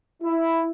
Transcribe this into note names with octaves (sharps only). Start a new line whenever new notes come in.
E4